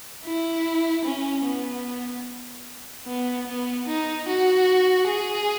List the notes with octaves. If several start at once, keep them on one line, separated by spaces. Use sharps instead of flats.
E4
C#4
B3
B3
B3
D#4
F#4
G#4